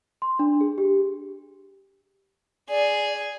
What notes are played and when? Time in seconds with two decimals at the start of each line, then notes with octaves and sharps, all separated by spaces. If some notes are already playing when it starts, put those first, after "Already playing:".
0.22 C6
0.39 D4
0.61 G#4
0.78 G4
2.70 G#4 D5